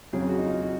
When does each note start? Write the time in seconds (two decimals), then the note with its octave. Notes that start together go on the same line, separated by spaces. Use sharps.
0.13 F2 C#3 F#3 G#4
0.29 F#4
0.38 D#4
0.45 F4
0.62 F#4